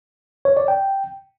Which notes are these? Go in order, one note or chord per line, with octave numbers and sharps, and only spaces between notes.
C#5
D5
G5